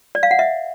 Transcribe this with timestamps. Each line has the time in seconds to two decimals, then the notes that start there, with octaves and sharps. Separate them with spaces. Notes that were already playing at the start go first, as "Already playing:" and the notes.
0.15 D5
0.23 F5
0.31 F#5
0.39 E5